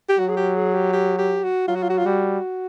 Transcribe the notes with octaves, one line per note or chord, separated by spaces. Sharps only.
G4
F#3 F#4
G#4
G4
G#4
G4
G4
G4
F#4
F#3 F4
F#4
F4
F#4
F4
G3 F#4